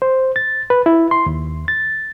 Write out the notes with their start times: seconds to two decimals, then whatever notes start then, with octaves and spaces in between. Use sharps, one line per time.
0.02 C5
0.36 A6
0.70 B4
0.86 E4
1.11 C6
1.26 D#2
1.68 A6